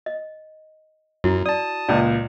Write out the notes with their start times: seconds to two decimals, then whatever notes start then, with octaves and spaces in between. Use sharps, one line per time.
0.06 D#5
1.24 F#2 E4 F#4
1.46 D5 A5 D#6
1.88 C#2 A#2 D5